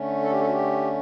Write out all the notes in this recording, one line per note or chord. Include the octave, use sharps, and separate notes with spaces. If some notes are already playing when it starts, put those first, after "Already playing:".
Already playing: D3 A3 C#4
A4
G4
A4
F#4
G4